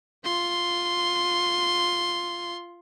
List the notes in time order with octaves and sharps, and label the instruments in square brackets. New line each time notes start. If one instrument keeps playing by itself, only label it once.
[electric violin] F4 C6